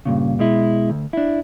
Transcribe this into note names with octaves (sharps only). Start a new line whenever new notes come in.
G2 A#2 C#3
B2 G#3 E4
D2
D4 E4